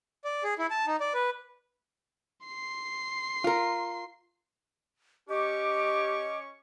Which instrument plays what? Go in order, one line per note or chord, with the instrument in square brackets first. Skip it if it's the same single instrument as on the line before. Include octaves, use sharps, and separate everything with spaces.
[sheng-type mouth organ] D5
G#4
E4
A5
D#4
D5
B4
[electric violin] C6 C7
[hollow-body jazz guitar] F4 A#4
[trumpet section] C#4 C#5 C#6 [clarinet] G4 [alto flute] D#5 [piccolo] D6